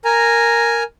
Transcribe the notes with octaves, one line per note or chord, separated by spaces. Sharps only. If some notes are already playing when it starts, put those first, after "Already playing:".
A#4 G#5 A#5